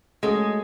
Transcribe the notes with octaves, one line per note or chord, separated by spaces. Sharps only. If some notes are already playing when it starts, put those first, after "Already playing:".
G#3 A3 C#4 F#4 A4